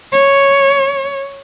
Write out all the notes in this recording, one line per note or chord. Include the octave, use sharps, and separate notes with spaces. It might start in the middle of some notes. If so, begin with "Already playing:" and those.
C#5